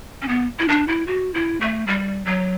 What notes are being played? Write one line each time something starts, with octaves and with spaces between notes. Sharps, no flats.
C#4
B3
E4
D4
E4
F#4
E4
A3
G3
F#3